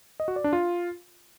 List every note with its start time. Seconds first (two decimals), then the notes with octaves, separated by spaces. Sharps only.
0.20 D#5
0.28 F#4
0.36 D5
0.44 D4
0.53 F4